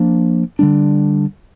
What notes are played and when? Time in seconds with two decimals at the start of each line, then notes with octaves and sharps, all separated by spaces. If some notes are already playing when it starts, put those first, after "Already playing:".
Already playing: F3 A#3 D4
0.59 D3 G3 D4